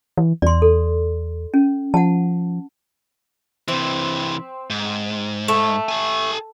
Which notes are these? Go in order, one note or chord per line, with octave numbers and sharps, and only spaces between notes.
E3
E2 D5 C6
A4
C#4
F3 F#5 A5
C3 E3 C4
G#2
A3
A4 G#5